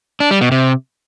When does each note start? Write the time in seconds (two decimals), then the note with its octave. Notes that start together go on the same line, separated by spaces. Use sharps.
0.20 D4
0.31 G3
0.41 B2
0.52 C3